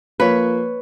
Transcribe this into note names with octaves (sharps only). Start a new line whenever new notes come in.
F3 A#3 B4 C#5